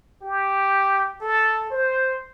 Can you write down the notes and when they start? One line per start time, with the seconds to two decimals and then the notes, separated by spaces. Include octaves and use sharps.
0.22 G4
1.21 A4
1.70 C5